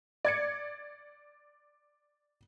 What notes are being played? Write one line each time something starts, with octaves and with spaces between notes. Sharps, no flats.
D5 G#6 C#7